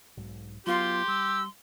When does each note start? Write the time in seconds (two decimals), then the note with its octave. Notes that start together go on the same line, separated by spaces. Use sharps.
0.17 B1 G#2
0.67 F#3 B3 F4 G4 C6
1.08 G3 E6